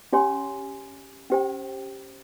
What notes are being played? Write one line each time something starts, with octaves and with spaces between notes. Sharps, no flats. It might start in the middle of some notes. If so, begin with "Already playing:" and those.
C#4 G4 C#5 G#5 C6
C#4 G4 C5 G5